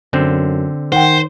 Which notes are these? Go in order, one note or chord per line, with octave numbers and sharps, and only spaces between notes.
F#2 D3 C4
D#3 C5 F#5 G5